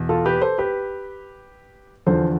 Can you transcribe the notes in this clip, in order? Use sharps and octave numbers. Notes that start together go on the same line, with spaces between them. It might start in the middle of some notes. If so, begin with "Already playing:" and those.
Already playing: E2 B2
F4 A4
G4 B4
A4 C5
G4 B4
E2 D3 F3 A4 C5